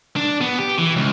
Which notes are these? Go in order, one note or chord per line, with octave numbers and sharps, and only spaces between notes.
D4
B3
G4
E3
C#2